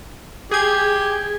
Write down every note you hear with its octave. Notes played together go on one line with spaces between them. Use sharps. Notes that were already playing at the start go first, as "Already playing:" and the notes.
G4 G#4 G#6